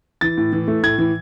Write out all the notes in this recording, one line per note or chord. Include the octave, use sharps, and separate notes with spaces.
E3 A6
A2
E3
A3
A2 G#6
E3